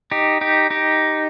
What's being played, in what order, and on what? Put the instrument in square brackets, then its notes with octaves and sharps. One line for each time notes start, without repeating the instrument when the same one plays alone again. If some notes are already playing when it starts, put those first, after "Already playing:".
[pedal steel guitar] D#4 G4
D#4 G4
D#4 G4